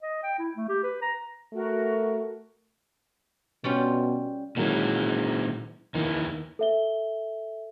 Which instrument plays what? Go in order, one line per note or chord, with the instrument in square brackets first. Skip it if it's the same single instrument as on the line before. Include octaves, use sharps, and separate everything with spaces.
[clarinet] D#5
G5
E4
A3
G4
B4
A#5
[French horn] A3 [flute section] F#4 A#4
[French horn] B2 [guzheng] G3 C#4 F4
[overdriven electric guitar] A#2 E3 [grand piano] D#3 F#3 G#3
[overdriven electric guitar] D#2 E3 [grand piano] D#3
[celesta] A4 E5 G7